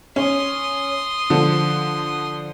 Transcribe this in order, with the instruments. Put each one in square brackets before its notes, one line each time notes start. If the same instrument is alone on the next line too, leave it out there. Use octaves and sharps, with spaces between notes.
[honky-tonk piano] C#4 [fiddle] C6 D#6
[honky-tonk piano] D3 F3